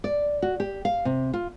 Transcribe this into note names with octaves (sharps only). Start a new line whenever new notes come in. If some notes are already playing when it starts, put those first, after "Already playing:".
D5
F#4
G4
F5
C3
F4